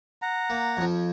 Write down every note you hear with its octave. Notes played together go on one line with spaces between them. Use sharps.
F#5 A#5
A#3
F2 F3